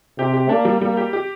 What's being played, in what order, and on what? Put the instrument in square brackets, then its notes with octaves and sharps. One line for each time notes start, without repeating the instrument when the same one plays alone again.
[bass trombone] C3 [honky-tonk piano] G4
[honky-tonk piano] G4
[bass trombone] A#3 [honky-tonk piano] D4
[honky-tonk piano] G3
[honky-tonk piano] G3 [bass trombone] A#3
[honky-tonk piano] G4
G4